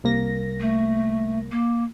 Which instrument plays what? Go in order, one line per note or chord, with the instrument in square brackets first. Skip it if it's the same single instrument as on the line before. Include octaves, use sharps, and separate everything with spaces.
[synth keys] C2 A#3 A#6
[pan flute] A3
A#3